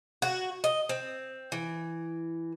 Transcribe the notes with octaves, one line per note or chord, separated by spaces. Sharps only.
F#4
D#5
C4
E3